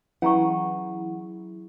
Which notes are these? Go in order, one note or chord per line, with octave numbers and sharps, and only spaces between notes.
E3 F#3 C#4 E4 G#4 F#5 A#5 C#6